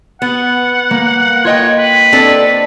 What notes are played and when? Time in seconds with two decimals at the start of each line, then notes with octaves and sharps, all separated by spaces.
0.22 B3 F#5
0.91 A#3
1.45 F4 C#5 D#5 G5
1.78 B4
2.13 C4 D4 A4